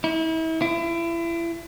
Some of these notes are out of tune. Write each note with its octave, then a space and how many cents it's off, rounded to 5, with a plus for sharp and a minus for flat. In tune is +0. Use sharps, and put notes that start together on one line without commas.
E4 -35
E4 +35